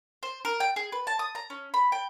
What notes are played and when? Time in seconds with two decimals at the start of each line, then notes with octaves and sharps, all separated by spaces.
0.23 C5
0.45 A#4
0.60 G5
0.76 G#4
0.92 B4
1.07 A5
1.19 D#6
1.35 A#5
1.50 C#4
1.74 B5
1.92 G5